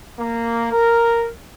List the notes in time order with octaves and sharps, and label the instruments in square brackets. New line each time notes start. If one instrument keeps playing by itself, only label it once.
[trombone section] A#3
A#4